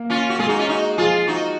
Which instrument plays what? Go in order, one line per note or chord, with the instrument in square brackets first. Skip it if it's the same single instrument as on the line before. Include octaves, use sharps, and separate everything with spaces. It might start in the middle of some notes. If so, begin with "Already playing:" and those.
Already playing: [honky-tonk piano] A#3
[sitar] C#4 F4
F#4
[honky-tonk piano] G#3 [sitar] F4 G#4
[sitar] D#4 F#4
C#4 F4
D#4 F#4
[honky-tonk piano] F3 [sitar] F4 G#4
[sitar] D#4 F#4